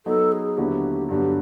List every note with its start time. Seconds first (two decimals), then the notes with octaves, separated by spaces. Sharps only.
0.06 F#3 B3 D#4 A4
0.32 G#4
0.57 D#2 D3 F#3 B3 E4 G4
1.09 G2 D3 F#3 B3 G4